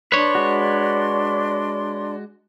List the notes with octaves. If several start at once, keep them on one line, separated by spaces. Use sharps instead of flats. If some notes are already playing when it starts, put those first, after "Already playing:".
D4 B4 C#5 D5 C6
G#3 F#4